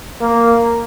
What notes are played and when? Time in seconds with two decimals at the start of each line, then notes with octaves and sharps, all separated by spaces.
0.21 A#3